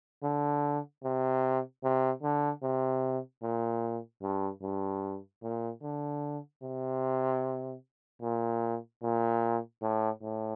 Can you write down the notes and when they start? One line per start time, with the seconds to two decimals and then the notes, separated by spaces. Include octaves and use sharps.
0.23 D3
1.04 C3
1.84 C3
2.23 D3
2.63 C3
3.43 A#2
4.22 G2
4.62 G2
5.43 A#2
5.82 D3
6.63 C3
8.22 A#2
9.02 A#2
9.82 A2
10.22 A2